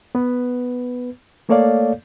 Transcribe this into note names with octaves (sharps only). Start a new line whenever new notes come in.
B3 B4
A3 A#3 A4 C#5 D5 F5